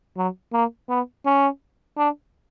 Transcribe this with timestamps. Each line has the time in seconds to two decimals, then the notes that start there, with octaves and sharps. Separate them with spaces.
0.17 F#3
0.53 A#3
0.89 B3
1.26 C#4
1.97 D4